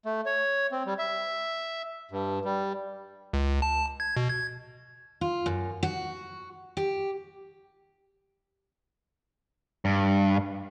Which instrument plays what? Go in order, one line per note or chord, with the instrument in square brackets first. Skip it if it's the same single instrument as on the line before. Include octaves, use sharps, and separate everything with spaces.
[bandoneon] A3
C#5
C4
G3
E5
G2
G3
[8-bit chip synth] C#2
A5
G#6
B2
G#6
[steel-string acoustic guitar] F4
F#2
F#4
G4
[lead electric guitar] G2